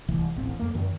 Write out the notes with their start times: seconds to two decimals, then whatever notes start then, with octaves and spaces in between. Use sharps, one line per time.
0.08 D1 C2 E3
0.35 D1 A1 C4
0.59 F2 A#3
0.75 F#2 D#3